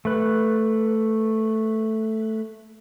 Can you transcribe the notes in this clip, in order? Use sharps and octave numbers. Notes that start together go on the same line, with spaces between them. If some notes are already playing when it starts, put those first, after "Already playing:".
A3 B4